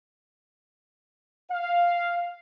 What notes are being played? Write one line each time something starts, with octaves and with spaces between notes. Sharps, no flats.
F5